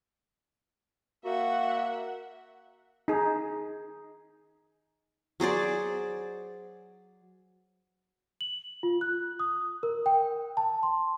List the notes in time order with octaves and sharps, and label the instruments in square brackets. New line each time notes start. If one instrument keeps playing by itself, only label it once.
[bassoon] A#3 [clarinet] F#4 [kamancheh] E5 F#5
[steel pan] D#4 G#4
[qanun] F#3 G#4 C5 D5
[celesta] F#7
F4
F#6
D#6
A#4
G5
A5
C6